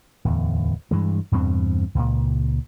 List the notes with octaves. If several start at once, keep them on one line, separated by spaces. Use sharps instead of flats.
D1 E2
G2 E3 G#3
E2 G2 B2 C4
C#2 A#2